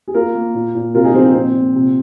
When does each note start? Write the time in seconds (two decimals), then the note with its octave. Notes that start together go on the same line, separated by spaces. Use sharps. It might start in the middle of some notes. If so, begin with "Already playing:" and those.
0.08 G#4
0.14 A#3 F4 A#4
0.34 A#3
0.54 A#2
0.75 A#2
0.94 C3 F4 A#4
1.04 D#4 G#4
1.14 F3 C4 F4
1.24 D#4
1.34 A#2 C4
1.54 A#2
1.75 C3